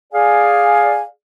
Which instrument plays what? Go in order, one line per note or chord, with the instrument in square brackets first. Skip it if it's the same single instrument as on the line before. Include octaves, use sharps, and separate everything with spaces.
[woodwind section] G#4 D5 F5 G#5